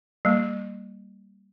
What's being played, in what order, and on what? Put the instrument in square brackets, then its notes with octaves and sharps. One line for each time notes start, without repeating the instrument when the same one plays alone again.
[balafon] G3 A#3